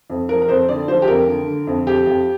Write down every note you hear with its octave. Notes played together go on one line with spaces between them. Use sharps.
F2
F3 A#4
A#4
F2 C5
D3 D5
F3 C5
G4
F2 A#4
D3
D3
F2
F2 G4
F2